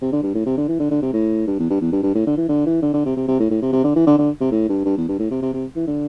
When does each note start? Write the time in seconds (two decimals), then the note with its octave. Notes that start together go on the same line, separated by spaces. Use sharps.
0.02 C3
0.12 D3
0.23 G2
0.35 A2
0.46 C3
0.57 D3
0.68 E3
0.79 D3
0.91 D3
1.02 C3
1.13 A2
1.47 G2
1.59 E2
1.70 G2
1.81 E2
1.92 G2
2.03 G2
2.15 A2
2.27 D3
2.37 E3
2.49 D3
2.66 E3
2.83 D3
2.94 D3
3.06 C3
3.17 C3
3.28 C3
3.40 A2
3.51 A2
3.62 C3
3.72 C3
3.84 D3
3.96 E3
4.07 D3
4.18 D3
4.41 C3
4.51 A2
4.69 G2
4.85 G2
4.97 E2
5.08 G2
5.20 A2
5.31 C3
5.42 C3
5.54 C3
5.76 E3
5.87 D3